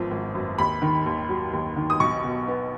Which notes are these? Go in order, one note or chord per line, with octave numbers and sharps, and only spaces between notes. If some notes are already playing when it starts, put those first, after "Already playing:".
Already playing: G#1 F#2 F3 B3
G#1
F#2
D#2 B5
D#3
D#2
F#3
D#2
D#3
D#6
B1 C#6
B2
B3